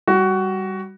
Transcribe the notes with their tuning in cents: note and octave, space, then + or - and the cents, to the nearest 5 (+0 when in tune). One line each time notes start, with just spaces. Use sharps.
G3 +0 F#4 +15